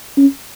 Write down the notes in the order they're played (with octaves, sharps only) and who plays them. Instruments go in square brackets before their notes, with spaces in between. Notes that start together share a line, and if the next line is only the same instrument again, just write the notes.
[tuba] C#4